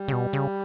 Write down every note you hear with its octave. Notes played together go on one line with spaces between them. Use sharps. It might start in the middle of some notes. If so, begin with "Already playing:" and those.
Already playing: G3
C#3
B2
C#3